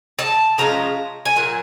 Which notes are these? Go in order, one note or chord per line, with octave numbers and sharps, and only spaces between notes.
A5
C#3 F3 G#3 C#4 A#5
G#5
A#2 F#3